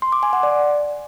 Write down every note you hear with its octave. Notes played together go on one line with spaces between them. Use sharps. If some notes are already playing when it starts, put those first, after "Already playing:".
C6
D6
G#5
F#5
D5